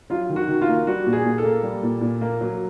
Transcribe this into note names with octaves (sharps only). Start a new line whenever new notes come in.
F#3 F4
D#3
F#4
D#3
F4
A#3
G3 F#4
A#2
G#4
A#2
A4
A#3
G3
A#2
A#2
A#3
F#3